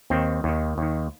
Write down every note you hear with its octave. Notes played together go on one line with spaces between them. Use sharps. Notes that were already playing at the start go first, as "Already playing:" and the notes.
D#2 D#3 C4
D#2 D#3
D#2 D#3